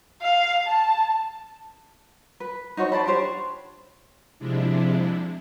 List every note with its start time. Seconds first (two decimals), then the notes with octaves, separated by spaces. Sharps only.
0.22 F5
0.67 A5
2.40 B4
2.77 D#4 F#4 C5 C#5
2.92 C5 D5 A5 B5
3.07 D4 G4 C5 C#5
4.39 C3 F3 G#3 D4 E4